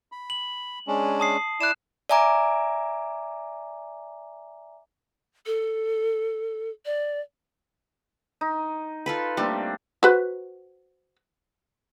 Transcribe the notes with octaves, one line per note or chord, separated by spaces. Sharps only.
B5
F#7
G#3 C#4 D4
A5 D#6 C7
E4 D5 D#6 F#6 E7
D5 E5 G#5 A#5 D6
A4
D5
D#4
F4 A4 B4
G3 A3 A#3 C4 D4
F#4 B4 C5